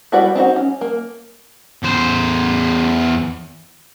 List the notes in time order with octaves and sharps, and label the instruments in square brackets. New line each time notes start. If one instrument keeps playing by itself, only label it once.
[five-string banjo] G3 E4 F#4 B4 D5
C4 D#4 E4 F#4
C#4
A#3
[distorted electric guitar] E2 C5